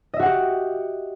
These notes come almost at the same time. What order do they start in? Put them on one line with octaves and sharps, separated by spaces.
D#5 E5 F#4 F#5 G4